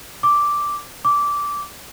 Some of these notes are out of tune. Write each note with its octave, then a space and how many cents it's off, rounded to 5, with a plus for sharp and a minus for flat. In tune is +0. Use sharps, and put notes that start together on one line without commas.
D6 -5
D6 -15